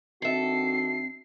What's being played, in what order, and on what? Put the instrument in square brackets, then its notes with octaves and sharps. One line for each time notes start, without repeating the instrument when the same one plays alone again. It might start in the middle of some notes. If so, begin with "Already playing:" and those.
[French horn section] D#3 D4 F#4 [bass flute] C4 [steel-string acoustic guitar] A4 E5 [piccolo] C7